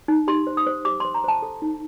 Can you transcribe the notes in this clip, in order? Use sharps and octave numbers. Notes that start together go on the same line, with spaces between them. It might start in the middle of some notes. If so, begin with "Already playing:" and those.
D#4
G4 C6
C5
D#6
C5
G4 D6
C5 C6
A#5
C5 A5
A4
D#4